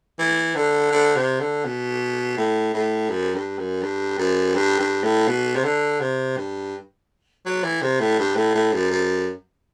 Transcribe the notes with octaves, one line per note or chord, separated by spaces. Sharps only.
E3
D3
D3
C3
D3
B2
A2
A2
F#2
G2
F#2
G2
F#2
G2
G2
A2
B2
C3
D3
C3
G2
F#3
E3
C3
A2
G2
A2
A2
F#2
F#2